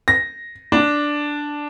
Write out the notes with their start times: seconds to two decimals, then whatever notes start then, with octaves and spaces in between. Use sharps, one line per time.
0.08 A#6
0.72 D4